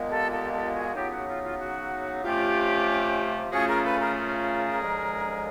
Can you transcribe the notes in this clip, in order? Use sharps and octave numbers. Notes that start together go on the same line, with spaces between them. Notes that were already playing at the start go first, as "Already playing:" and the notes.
Already playing: A#2 F3 G#3 B3 D#4
G4 A4
G4 A4
G4 A4
F#4 G#4
C#3 F#3 B3 D#4 F4 G4
F#4
F4
F4
F#4
C3 F3 A3 C#4 F4 G4
C#3 F3 A3 C#4 F4 F#4 G#4
G#4 A#4
A4 B4
G#4 A#4
G#4 A#4
D#2 D3 F3 G#3 C#4